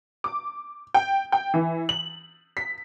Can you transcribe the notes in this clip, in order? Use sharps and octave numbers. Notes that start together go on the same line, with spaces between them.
D6
G5
G5
E3
F#7
B6